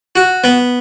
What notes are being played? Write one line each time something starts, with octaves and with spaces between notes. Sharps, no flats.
F#4
B3